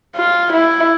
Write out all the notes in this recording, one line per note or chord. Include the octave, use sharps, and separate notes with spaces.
F4
E4